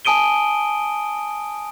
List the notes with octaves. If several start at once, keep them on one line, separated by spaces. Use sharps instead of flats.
G#5 A5 D#6 D7 D#7 G7